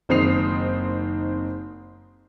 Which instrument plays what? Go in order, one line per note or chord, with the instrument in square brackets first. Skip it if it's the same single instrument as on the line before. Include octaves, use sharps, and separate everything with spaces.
[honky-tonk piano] F#1 D#3 C4 D#6 C7 F7